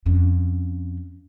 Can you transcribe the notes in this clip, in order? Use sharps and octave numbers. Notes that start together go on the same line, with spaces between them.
F2 C#4